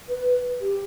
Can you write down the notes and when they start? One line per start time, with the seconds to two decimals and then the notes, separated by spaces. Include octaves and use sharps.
0.09 B4
0.61 G4